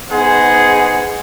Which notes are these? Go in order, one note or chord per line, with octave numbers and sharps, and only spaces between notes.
B3 D#4 G#4 C5 F#5